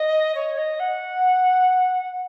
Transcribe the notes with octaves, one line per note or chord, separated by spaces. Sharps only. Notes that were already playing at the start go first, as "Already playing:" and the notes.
Already playing: D#5
C#5
D#5
F#5